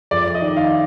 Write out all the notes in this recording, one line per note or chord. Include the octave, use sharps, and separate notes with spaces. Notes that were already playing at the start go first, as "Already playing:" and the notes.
F2 D5
D#5
D#3
F5